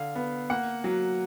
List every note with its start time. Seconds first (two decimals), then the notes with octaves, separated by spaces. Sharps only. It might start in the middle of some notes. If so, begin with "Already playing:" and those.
Already playing: D3 F5
0.15 B3
0.50 A#3 F#5
0.84 F#3